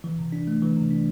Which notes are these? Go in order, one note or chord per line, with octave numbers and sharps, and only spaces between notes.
E3
C3
D4
A3
E3
C3
D4